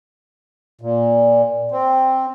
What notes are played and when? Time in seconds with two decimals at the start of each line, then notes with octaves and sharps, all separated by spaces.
0.81 A#2
1.71 C4